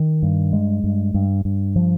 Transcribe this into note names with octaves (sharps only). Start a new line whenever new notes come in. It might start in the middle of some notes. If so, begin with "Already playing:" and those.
Already playing: D#3
G2
G#3
G2
G2
G2
F3